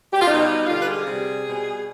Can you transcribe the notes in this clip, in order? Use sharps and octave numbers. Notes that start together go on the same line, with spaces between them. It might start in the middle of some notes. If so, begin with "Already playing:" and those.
G4
F4
B2 G3 D#4
D3 G3 F4
B4
G#4
C3 G3
B2 G3